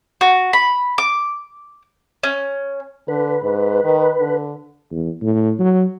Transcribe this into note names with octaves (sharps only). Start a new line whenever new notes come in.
F#4
B5
D6
C#4
D3 B4
G#2
D#3
D3
E2
A2
F#3